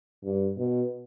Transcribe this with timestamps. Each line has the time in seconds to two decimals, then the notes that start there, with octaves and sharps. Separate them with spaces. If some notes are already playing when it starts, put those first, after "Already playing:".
0.24 G2
0.58 B2